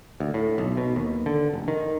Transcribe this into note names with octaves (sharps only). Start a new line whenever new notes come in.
D2
A2
B1
B2
D#2
D3
F1
D#3